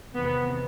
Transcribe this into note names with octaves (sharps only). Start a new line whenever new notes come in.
E2 C3 D#3 B3